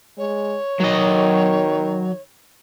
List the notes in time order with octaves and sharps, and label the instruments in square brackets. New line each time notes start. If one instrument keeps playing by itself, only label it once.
[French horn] G#3 [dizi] C#5
[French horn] D#3 [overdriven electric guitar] F#3 D#5